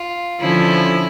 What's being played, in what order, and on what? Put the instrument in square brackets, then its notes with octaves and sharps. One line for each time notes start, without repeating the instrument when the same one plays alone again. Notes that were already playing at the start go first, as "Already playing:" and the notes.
Already playing: [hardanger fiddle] F4
[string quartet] D3 F3 C#4 [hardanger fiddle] E4